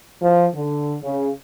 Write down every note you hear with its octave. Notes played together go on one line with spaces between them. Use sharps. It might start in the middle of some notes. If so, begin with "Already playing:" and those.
F3
D3
C#3